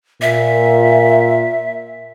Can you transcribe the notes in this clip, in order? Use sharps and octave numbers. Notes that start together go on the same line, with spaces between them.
A#2 E5